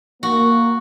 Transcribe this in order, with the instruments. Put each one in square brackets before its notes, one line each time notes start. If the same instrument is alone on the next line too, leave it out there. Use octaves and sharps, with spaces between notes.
[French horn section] A#3 [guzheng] F#4